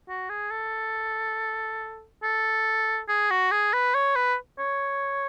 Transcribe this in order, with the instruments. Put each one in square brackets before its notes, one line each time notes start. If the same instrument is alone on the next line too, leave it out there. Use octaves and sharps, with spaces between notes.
[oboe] F#4
G#4
A4
A4
G#4
F#4
G#4
B4
C#5
B4
C#5